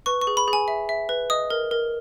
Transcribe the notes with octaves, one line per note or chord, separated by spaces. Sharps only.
B4 C#6
C#6
G#4
B5
G#4
G#5
E5
E5
B4
D#5 D#6
A#4
A#4